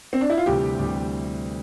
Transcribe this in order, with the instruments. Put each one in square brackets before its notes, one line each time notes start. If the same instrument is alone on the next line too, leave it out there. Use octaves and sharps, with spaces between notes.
[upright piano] C4
D4
E4
F4
[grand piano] D2 C3 E3 G3 [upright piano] G4
[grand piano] D2 C3 E3 G3